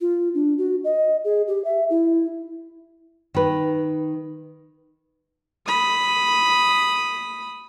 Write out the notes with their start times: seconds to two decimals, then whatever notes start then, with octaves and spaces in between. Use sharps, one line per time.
0.01 F4
0.35 D4
0.58 F#4
0.84 D#5
1.24 G#4
1.48 G4
1.65 E5
1.90 E4
3.34 D#3 B4
5.67 B5 D#6